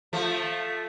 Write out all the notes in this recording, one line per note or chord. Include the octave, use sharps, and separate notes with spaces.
F3 A3